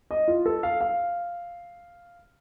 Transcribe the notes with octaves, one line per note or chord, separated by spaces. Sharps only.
D#5
F4
A4
F5
F5